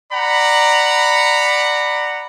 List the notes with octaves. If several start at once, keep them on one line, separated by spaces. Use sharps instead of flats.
D5 F#5 A#5 B5